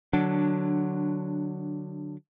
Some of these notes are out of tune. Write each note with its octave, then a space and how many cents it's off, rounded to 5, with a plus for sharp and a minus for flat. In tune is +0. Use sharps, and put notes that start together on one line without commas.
D3 +20 F#3 +0 D4 +0